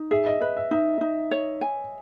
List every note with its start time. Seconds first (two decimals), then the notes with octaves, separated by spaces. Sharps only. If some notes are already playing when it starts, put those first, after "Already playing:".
Already playing: D#4
0.11 G#4 E5
0.26 D#5
0.41 B4 D#5
0.57 E5
0.71 D#4 E5
1.01 D#4
1.31 C#5
1.61 G#5